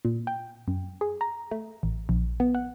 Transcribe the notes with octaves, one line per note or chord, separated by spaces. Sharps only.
A#2
G5
F#2
G#4
A#5
A3
A1
A#1
B3
F#5